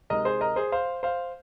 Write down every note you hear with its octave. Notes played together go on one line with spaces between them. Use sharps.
C3 G#3 D#4 A#4 D#5
G#4 C5
A#4 D#5
G#4 C5
C5 F5
C5 F5